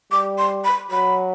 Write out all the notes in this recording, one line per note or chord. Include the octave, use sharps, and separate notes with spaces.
G3 D6
C6
B5
F#3 B5